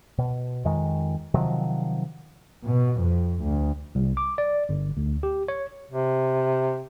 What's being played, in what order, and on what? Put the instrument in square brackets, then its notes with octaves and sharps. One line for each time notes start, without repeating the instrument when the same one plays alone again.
[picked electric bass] B2
F2 D#3 G#3
C3 D#3 F3 F#3
[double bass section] B2
F2
D2
[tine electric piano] C2
D6
D5
G1
D2
G4
C#5
[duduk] C3